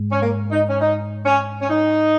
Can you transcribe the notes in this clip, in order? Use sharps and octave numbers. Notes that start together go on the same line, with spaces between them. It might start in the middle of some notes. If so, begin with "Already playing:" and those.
Already playing: G#2 G#3
C#4
A#3
D#4
C#4
D#4
C#4
C#4
D#4